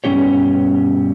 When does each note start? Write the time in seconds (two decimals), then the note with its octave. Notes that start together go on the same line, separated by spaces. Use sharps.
0.04 G2 B2 F3 C#4 G4 C#5